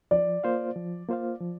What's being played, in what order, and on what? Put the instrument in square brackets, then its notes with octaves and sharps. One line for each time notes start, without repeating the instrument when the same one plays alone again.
[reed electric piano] F3 [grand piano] D5
[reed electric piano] A#3 F4 C5 F5
F3
A#3 F4 C5 F5
F3